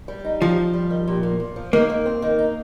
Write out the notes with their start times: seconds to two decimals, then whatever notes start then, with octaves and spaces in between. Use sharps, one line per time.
0.08 G3
0.25 D#4
0.41 F3 G4
0.58 G4
0.74 G3
0.91 D#3
1.08 A#2
1.23 A#2
1.40 A#2
1.56 F3
1.73 D#3 A#3
1.90 D#3
2.06 C4
2.22 D#3
2.39 D#4